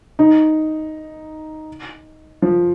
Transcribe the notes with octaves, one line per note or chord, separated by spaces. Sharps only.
D#4
F3